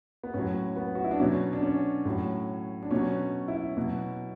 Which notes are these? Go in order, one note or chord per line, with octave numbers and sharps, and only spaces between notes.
B3
A2 F#3 C#4
B3
F#4
E4
D4
B2 F#3 C#4
D4
C#4
A2 F#3
D4
B2 F#3 C#4
E4
B2 F#3